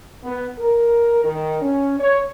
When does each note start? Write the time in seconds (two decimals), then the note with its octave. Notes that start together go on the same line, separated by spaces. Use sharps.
0.23 B3
0.58 A#4
1.24 D#3
1.61 C#4
1.98 C#5